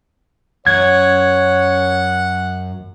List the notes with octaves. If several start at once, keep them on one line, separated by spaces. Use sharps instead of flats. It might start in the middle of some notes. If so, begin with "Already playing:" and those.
F#2 C#5 F#5 G#6